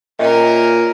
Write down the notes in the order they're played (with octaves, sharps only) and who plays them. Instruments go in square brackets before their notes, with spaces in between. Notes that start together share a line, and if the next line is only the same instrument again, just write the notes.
[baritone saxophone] A#2 [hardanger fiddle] C#4 A#4 [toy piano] D#5 E5 G5